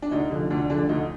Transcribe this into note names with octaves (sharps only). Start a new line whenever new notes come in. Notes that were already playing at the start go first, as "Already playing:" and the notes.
D4
D2 D#4
D3 F3
D2 D4
D3 F3 D4
D2 D#4